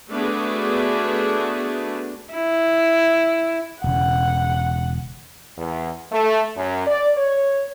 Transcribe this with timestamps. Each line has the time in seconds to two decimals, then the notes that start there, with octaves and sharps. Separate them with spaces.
0.11 A3 B3 D4 F#4 G#4
2.33 E4
3.84 E1 C#3 F#5
5.58 E2
6.12 A3
6.57 F#2
6.87 D5
7.17 C#5